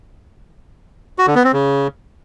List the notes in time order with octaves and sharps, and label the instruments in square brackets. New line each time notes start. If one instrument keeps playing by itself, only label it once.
[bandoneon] F#4
D3
B3
C4
C#3